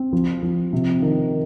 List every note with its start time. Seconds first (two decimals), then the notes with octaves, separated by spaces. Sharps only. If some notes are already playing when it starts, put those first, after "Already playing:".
Already playing: C4
0.13 F3
0.43 F3
0.73 C3
1.02 D#3